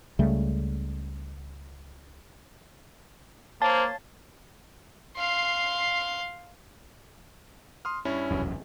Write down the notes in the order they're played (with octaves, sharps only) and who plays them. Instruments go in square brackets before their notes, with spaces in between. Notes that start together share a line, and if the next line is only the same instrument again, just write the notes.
[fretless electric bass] C#2 C#3 G3 A3
[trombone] A#3 [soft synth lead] C5 [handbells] C#5 F5 A6 [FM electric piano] A5
[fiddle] F5 C6
[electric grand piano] C6 D#6 F6
G2 C#4 E4
[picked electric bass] E1 C2 F#2